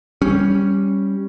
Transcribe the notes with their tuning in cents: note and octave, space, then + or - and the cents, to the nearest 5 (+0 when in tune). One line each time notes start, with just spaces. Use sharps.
G3 +0 C#4 +0